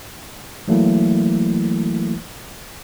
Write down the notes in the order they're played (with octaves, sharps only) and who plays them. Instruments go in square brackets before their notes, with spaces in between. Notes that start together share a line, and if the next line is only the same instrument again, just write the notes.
[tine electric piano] E3 F#3 A3 A#3 E4